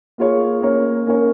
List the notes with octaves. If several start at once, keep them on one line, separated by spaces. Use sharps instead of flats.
A#3 F4 G#4 C#5
A#3 C#4 A#4 C#5
A#3 C#4 A#4 C#5